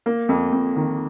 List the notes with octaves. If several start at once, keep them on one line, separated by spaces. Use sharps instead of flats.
A#3
F2
F2
D#3